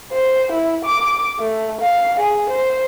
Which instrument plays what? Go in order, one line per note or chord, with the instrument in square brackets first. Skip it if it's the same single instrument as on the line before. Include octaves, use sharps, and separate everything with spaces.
[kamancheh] C5
E4
D6
A3
F5
G#4
C5